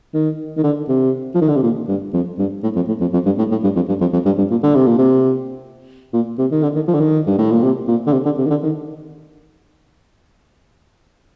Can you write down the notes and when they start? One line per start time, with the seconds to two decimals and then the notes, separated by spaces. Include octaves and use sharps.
0.14 D#3
0.57 D#3
0.63 D3
0.88 C3
1.34 F3
1.41 D#3
1.49 D3
1.56 C3
1.63 A#2
1.88 G2
2.13 F2
2.38 G2
2.63 A2
2.76 F2
2.88 A2
3.01 F2
3.13 F2
3.26 G2
3.38 A2
3.51 A2
3.63 G2
3.76 F2
3.88 G2
4.01 F2
4.13 F2
4.25 G2
4.38 G2
4.51 A#2
4.63 D3
4.75 C3
4.87 A#2
4.98 C3
6.13 A#2
6.38 C3
6.52 D#3
6.63 D3
6.75 D#3
6.88 F3
6.94 D3
7.00 D#3
7.26 G2
7.38 A2
7.51 A#2
7.63 C3
7.88 A#2
8.07 D3
8.12 C3
8.25 D3
8.38 C3
8.45 D#3
8.50 D3
8.63 D#3